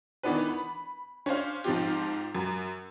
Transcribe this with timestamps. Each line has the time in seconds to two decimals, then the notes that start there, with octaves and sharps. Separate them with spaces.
0.23 D#3 E3 B3 D4 B4
0.48 B5
1.26 C#4 D4 C5 F5
1.64 G#2 F3 C4 F4 G4
2.35 F#2